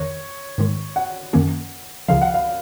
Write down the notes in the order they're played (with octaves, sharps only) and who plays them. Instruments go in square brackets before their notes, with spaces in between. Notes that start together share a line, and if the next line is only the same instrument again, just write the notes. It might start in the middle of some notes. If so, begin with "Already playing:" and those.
Already playing: [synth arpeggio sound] F2 D#3 [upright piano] C#5
[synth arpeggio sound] G#2 D#3 G#3
[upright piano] F#5
[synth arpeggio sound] F#2 D#3 A#3 C#4
[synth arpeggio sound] C#2 C#3 F3 [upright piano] F5
[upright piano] F#5
F5